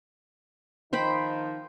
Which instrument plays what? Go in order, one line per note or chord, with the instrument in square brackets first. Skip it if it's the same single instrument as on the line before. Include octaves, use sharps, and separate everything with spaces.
[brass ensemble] D#3 F3 D#4 [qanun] C5 G5 B5